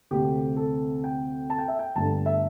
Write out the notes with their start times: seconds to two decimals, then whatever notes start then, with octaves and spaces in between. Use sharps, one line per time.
0.11 D2 C3 A3 C4 G4
0.57 A4
1.04 G5
1.50 A5
1.58 G5
1.68 E5
1.79 G5
1.95 G1 G2 D3 A3 A5
2.26 E5